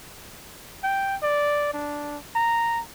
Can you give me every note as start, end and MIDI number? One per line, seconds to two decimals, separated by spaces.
0.83 1.16 79
1.22 1.70 74
1.74 2.18 62
2.35 2.81 82